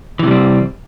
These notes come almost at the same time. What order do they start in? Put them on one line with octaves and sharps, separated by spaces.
E3 C3 G3 C4